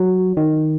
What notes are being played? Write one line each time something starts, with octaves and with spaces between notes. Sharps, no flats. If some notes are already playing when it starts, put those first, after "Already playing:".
Already playing: F#3
D#3